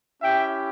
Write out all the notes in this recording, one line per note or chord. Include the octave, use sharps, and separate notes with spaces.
C#4 E4 G4 E5 G5